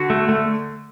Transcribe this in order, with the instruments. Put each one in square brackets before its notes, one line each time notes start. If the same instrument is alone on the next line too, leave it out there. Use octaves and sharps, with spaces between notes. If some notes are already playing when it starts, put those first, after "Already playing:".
Already playing: [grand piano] D3 [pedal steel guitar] F#4
[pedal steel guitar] A3
A3